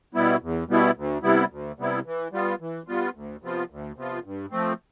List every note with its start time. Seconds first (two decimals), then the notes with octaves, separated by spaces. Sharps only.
0.14 B2 G3 B3 E4
0.42 E2
0.69 B2 G3 B3 E4
0.96 D2
1.23 C3 G3 B3 E4
1.50 D2
1.79 C3 G3 B3 E4
2.06 E3
2.32 G3 B3 F4
2.61 E3
2.88 G3 B3 F4
3.14 D2
3.42 C3 F3 B3 F4
3.70 D2
3.96 C3 F3 B3 F4
4.24 G2
4.51 F3 A3 C4